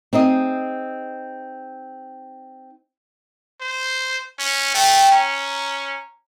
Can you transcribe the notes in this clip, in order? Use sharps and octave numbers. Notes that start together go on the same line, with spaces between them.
C4 D#4 G#4 D#5
C5
C#4
A3 G5
C#4 A#5